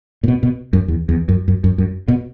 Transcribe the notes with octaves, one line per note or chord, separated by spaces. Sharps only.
A#2
B2
B2
F#2
E2
E2
F#2
F#2
F#2
F#2
B2